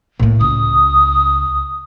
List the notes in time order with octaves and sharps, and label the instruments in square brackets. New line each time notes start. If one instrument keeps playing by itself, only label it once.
[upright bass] A2 A#3
[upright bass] C#2 [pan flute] D#6